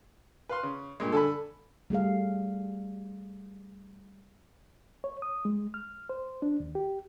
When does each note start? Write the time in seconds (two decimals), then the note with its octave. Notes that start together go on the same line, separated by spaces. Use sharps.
0.49 B4 F5 C6
0.63 C#3
1.00 G2 A#2 G#3
1.12 D3 A4 G#5 B5
1.90 G3 A3 G#4 F5
5.04 C#5
5.22 D#6
5.45 G#3
5.74 F6
6.09 C5
6.42 D4
6.60 D#2
6.75 G4